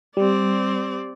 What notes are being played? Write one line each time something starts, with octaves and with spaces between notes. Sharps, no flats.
G3 C4 D5